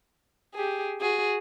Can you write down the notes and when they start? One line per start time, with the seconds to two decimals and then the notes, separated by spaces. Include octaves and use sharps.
0.54 G4 G#4
1.01 F#4 G#4